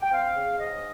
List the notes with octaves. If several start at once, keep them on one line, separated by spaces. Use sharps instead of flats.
G5
C4 F5
C#3
G#2 D#5